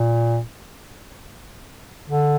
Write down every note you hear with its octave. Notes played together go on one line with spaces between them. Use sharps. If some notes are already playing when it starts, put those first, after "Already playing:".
Already playing: A#2
D3